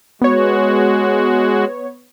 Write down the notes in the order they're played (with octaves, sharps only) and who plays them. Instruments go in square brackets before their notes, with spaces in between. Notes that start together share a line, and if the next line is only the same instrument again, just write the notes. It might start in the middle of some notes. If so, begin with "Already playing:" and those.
[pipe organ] G#3 F#4 [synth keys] B3 C#5